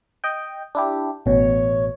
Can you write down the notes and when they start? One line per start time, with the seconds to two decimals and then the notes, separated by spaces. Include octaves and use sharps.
0.24 D#5 G5
0.75 D4 E4 G4
1.26 A1 B2 C#5